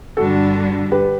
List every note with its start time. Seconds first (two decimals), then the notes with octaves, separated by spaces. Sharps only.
0.17 G2 D3 G3 D4 F#4 A4
0.92 G4 B4